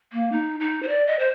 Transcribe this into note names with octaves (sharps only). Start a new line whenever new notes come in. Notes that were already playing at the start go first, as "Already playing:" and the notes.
A#3
D#4
D#4
C5
D5
D#5
C5